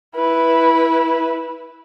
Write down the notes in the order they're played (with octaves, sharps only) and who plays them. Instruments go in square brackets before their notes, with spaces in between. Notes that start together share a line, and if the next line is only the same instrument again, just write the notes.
[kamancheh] E4 B4